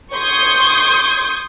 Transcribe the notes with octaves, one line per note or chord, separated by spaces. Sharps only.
C6 C#6 D#6 G6 G#6